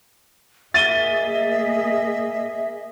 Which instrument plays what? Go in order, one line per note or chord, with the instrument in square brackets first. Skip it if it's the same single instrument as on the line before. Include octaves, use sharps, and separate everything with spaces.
[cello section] A#3 G#4 D#5 [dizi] E5 [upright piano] A6 D#7 G7